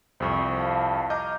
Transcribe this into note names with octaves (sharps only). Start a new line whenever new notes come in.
C2 F2 C5 C#6
F5 A5
D#5 A#5 D6 F6 G6